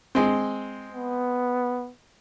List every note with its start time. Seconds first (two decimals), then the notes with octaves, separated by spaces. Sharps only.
0.15 G#3 C4
0.93 B3